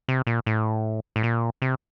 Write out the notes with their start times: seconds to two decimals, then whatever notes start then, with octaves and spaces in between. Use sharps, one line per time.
0.08 C3
0.27 A#2
0.46 A2
1.16 A2
1.23 A#2
1.62 C3